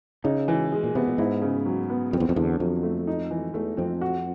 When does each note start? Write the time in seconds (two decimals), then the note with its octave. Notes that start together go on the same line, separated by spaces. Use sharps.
0.24 C#3 D#4
0.48 E3
0.72 G#3
0.84 A#2
0.95 C3 B3
1.08 A#2
1.18 G#2 E4
1.42 C#3
1.66 F#3
1.90 B3
2.13 F2 C4
2.20 E2
2.29 F2
2.36 E2 D3
2.60 F2 F#3
2.83 A3
3.07 D#4
3.31 E3
3.54 E2 A3
3.77 F2 C4
4.01 F#4